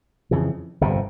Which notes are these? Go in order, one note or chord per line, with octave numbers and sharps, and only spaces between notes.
F2 C#3 E3
G1 F2 C3